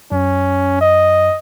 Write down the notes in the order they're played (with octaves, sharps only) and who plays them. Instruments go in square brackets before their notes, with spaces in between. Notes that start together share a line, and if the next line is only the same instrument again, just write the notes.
[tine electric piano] F#2 [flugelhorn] C#4
[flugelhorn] D#5